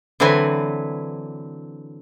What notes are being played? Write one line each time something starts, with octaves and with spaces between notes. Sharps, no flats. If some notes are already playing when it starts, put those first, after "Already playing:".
D3 E3 F#3 C4 B4 G#5